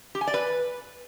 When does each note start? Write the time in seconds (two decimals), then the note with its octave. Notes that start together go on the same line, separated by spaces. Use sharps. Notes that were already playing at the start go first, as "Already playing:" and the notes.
0.15 G4
0.21 G#5
0.27 D5
0.34 B4